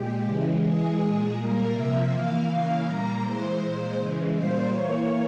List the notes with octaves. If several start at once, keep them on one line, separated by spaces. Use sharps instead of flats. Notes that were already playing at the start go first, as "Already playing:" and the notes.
Already playing: A#2 G#3 G4
C#3 E3 G#3
E3 G#3 G#4
A#2 G#3
A#2 G3 A#3 A#4
C3 F3 A#3 E5
E3 A#3 F5
C#3 E3 A#3
A#2 G3 A#3 A#5
E3 G#3 C5
A#2 G#3
C#3 E3 G#3
A#2 G3 A#3 C5
E3 A#3 C#5